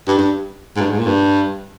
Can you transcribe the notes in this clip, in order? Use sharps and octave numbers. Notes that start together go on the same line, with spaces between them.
G2
G2
G#2
G2
G#2
A#2
G2